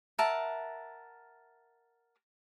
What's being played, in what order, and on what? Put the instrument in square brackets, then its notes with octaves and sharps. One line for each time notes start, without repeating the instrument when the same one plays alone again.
[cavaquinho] A#4 E5 F#5 A5